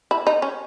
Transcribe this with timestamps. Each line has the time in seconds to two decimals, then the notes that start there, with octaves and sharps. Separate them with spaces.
0.11 E4
0.27 D#4
0.42 C#4